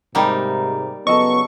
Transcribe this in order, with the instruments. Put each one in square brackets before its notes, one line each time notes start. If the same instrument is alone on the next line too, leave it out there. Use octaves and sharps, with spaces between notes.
[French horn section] G#2 C3 [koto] G3 A#3 D#4 [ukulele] G4 G5
[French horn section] C#3 F#3 B3 [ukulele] A4 D#5 [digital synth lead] C#6